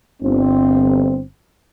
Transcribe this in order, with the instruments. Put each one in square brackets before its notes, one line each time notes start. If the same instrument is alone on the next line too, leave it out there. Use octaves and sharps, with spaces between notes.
[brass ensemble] G1 C4